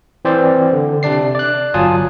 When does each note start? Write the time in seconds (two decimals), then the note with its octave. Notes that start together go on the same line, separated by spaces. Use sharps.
0.25 E3 C4 C5 D5
0.73 D3
1.03 C3 D4 D5 C7
1.35 D5 F#6
1.74 G1 F#3 F4 G#5 A5 D#6